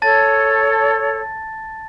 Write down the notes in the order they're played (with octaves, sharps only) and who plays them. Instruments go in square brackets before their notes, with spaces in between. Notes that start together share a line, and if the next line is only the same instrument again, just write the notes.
[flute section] A4 C#5 [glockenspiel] A5 A6